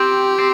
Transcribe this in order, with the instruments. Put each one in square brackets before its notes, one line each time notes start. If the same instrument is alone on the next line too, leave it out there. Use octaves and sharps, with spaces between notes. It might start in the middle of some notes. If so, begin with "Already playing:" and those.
Already playing: [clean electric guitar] C4 [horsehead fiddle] G4
[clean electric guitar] C4